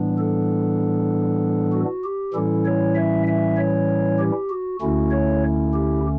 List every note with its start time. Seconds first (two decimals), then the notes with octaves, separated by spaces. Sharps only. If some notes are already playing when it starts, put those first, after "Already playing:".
Already playing: A2 E3 G3 B3 D4
0.18 A4
1.72 F#4
2.04 G4
2.34 A2 E3 G3 C#4 E4 A4
2.66 C#5
2.95 E5
3.27 E5
3.57 C#5
4.18 G4
4.50 F#4
4.80 D2 D3 A3 C#4 E4 F#4
5.11 C#5
5.74 G4